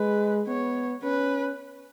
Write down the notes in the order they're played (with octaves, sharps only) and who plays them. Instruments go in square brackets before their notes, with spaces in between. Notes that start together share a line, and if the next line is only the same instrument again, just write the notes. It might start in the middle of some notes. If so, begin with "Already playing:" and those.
Already playing: [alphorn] G#3 [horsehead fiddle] B4
[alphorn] B3 [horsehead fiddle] C#5
[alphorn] C#4 [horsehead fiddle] B4